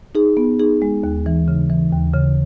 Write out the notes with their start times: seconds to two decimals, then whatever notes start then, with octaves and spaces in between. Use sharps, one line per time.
0.15 D#4 G#4
0.37 B3
0.59 D#4 G#4
0.82 G#3
1.04 D#2
1.26 E3
1.48 C#3
1.70 E3
1.92 D#2
2.14 C#3